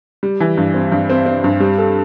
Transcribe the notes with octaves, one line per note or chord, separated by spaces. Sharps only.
G3
E3
G2
C4
G2
C4
C4
G2
G3
A4